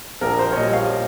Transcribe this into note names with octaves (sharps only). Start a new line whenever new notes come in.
A#1 A#4
C5
C#5
A#2 G3 D#5
F5